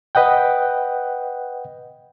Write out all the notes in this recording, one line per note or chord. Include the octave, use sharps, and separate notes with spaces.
B4 D#5 F#5 G5